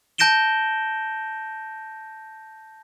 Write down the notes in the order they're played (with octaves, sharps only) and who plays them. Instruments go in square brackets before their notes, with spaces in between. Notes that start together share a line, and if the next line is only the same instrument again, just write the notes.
[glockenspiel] A5 G6 A#6 D7 E7 G7